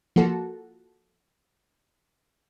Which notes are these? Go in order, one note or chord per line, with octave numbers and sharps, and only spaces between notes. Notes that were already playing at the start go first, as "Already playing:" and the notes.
F3 A#3 F#4 A4